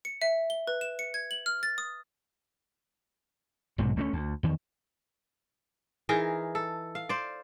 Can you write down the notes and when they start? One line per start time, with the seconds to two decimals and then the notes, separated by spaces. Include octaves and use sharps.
0.05 C#7
0.21 E5
0.50 G7
0.67 B4
0.81 E7
0.99 C#7
1.14 G#6
1.31 F#7
1.46 F6
1.63 A6
1.78 D#6
3.78 B1 G#2 C3 F#3
3.96 D2 A3 A#3 C#4
4.13 D2
4.43 E2 D#3
6.09 E3 D#4 G#4 A#4
6.55 A4
6.95 F5
7.09 C5 D5